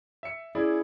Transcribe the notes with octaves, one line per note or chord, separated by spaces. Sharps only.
E5 C#7
C#4 E4 G#4 D5